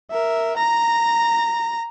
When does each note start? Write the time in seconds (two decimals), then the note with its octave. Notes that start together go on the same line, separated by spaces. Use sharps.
0.11 A#4 E5
0.57 A#5 A#6